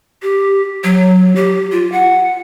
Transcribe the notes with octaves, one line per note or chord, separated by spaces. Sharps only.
G4
F#3
G4
F4
F#5